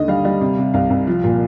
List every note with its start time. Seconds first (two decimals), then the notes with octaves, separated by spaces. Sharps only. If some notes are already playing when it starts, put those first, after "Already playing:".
Already playing: D#2 D3 D#5
0.08 G3 F5
0.25 G3
0.41 C3
0.58 C3
0.74 C2 F5
0.90 C2
1.07 F3
1.24 A#2